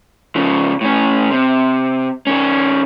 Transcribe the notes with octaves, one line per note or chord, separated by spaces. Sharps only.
C#3 F3
A2 C#4
C3
D#3 C#4